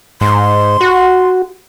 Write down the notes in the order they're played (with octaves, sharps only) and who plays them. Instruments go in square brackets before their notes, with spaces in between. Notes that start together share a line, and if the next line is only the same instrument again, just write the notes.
[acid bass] G#2 [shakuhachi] C6
[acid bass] F#4